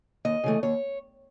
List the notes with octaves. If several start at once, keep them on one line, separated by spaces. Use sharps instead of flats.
D#2 D#5
C#3 E3 A3
D#2 C#5